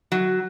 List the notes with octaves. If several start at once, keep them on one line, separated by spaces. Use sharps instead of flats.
F#3